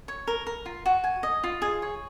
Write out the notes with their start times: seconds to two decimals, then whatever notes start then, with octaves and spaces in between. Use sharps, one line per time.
0.08 C#5
0.27 A#4
0.47 A#4
0.66 F4
0.86 F#4
1.04 G#5
1.23 D#5
1.44 F4
1.62 G#4
1.82 C#5